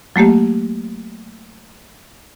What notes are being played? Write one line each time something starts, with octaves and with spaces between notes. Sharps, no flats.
F#3 A3 A#3 G4